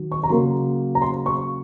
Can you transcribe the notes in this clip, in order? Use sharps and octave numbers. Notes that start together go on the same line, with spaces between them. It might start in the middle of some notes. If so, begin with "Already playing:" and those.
Already playing: D#3 F#3
C#6
A#5
C#3 F#3 A#3 C6
A#5
C6
C#6